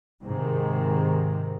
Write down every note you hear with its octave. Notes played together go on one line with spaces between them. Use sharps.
G#2 C3 D#3